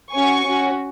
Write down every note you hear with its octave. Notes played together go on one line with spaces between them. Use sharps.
C#4 F#4 G#5 C#6
C#4 F#4